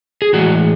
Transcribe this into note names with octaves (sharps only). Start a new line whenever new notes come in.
G#4
A2 E3 G#3 F#4